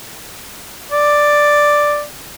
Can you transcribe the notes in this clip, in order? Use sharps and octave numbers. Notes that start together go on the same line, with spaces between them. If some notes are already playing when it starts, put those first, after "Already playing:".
D5